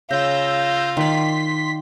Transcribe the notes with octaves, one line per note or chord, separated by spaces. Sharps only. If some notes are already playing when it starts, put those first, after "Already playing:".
C#3 F4 E6 G6 A#6
D#3 D5 C6 B6